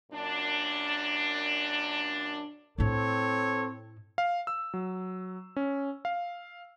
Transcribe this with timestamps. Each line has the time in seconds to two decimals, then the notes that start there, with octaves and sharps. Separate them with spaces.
0.12 F#2 A#2 D4
2.78 A2 C4 E4 A4 C#5
4.18 F5
4.47 E6
4.74 F#3
5.56 C#4
6.05 F5